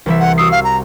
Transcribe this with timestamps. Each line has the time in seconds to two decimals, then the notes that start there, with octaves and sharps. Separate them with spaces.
0.06 C2 E3 E5
0.20 F#5
0.38 F#4 D#6 E6 C7
0.51 F5
0.64 A#5